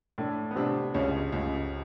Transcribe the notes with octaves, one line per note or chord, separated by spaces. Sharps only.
A2 A3 D4
B3
C3 C4 D4
C#2 C#3 C#4
C#2